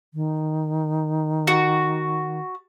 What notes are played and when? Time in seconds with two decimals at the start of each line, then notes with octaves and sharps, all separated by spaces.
0.14 D#3
1.47 F#4